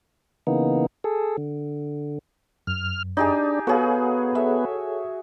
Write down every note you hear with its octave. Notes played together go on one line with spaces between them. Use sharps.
C#3 E3 A#3 B3 D#4
G#4 A4
D3
F#2 F6
D4 D#4 G4 G#4
B3 F#4 G#4 A4 C#5 F5
G#4 A4 C#5 E5